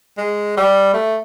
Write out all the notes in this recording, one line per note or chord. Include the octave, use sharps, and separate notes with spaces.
G#3
G3
A3